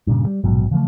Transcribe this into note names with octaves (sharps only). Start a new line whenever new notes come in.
G2 A#2 C#3
G3
A#1 G#2 B2 F#3
C#3 E3 F3 A3